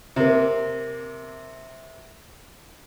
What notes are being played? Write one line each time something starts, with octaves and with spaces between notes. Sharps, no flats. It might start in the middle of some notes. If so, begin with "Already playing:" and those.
C3 A#3